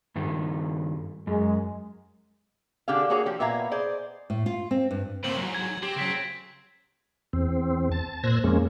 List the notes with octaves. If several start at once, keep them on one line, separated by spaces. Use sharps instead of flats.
G2 D#3
F#2 G#3
D3 D4 G4 G#4 F5
A#3 F#4 G#4 C#5
F3 G4
A#2 B3 E5 F5 G#5 A#5
G#4 C5 D5
A2
F4
C4
G2
C#3 A3 A#3 C4 C5 F#7
E2 G#2 F#3
G#6
C4 G4
C#3 F#3 B6 D7
E2 C4
A5
A#2 C5 E6 F#6 G#6 A#6
F2 G#3 A#3 C#4